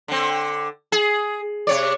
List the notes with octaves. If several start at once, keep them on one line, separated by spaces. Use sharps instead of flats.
D3 C4
G#4
C3 C#5 D5